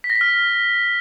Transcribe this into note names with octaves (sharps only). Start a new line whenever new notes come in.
B6
A#6
B6
F6